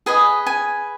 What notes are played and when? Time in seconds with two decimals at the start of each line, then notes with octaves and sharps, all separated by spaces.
0.06 G#4 B4 D#5 G#5
0.47 G#5